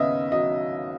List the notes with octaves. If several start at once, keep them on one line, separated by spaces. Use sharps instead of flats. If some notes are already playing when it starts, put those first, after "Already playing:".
Already playing: D#2 C#3 B3 D#5 E5
F#3 D#5